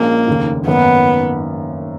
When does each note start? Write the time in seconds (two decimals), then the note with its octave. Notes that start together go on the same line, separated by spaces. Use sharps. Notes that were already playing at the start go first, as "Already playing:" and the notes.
Already playing: A#1 A#2 G#3 A#3 C#4 G#4
0.27 F1 D#2 C#3
0.66 G#1 F#2 D#3 A#3 B3